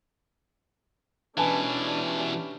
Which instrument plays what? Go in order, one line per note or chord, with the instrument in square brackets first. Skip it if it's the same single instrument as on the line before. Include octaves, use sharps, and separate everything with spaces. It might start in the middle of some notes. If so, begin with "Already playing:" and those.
[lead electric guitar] B2 E3 [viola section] C#4 D4 G4 [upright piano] B4 G#5 A5